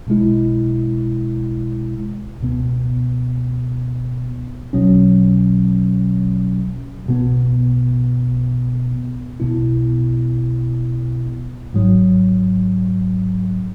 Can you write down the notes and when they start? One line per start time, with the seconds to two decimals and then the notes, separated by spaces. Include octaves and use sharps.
0.07 B1 B2 G#3 E4
2.40 C#2 B2 B3
4.73 B1 B2 F#3 C#4
7.06 B1 B2 B3
9.40 B1 B2 B3 E4
11.73 G#1 G#2 F#3